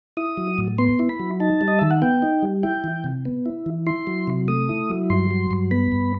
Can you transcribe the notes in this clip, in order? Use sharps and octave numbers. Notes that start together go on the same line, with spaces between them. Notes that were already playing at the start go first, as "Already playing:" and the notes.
E4 D#6
F#3
A2
B3 C6
E4
B5
F#3
D#4 A5
G3
D#5
D#3 E5
F#5
B3 G5
D#4
G3
E4 G5
E3
C3
B3
E4
E3
E4 C6
F#3
C3
A3 D#6
E4
F#3
G2 C6
F#3
G2
B3 B5
G2